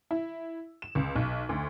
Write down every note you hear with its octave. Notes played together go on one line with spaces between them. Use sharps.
E4
E7
C#2
B1
D2